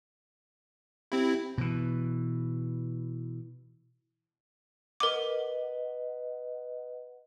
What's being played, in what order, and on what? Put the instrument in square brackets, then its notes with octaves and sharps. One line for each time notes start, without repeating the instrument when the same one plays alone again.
[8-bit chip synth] C4 E4 [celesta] G4
[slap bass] B2 E3
[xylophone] A#4 D6 [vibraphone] B4 D#5 F#5